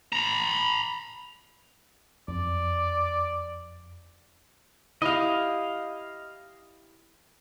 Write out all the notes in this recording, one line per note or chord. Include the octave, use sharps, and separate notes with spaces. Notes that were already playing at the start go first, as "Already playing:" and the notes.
A#5 B5
F2 D5
E4 G4 D#5 F5